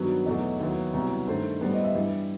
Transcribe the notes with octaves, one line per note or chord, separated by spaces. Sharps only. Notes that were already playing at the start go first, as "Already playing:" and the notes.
Already playing: G2 D#3 F#3 B3 F#4
E2 B2 F#3 A3 D#4
D#2 D#3 F#3 B3 E4
C2 B2 F#3
G2 D#3 A3 C5
A2 G3 B3 C5
D#5
E5
G2 E3 G3